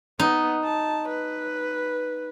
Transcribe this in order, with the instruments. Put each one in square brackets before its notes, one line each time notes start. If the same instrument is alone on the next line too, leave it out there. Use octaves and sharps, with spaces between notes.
[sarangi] B3 [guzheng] D#4
[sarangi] A5
B4